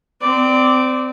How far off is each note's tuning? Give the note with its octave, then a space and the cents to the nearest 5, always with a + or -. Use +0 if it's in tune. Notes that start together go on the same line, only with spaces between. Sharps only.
C4 -25 D5 +0